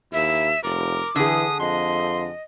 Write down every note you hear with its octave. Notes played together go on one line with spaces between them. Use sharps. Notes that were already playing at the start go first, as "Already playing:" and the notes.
D#2 E4 E5
F1 A#4 D6
D3 E3 G#4 D#6
F2 D#5 C6